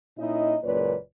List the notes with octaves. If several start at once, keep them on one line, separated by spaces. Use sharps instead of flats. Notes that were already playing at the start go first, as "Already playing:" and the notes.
A#2 C#4 D#4 E4 D#5
F#1 C#2 A#2 B4 C#5 D5